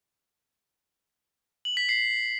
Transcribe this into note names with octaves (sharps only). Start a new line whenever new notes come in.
F#7
B6
C7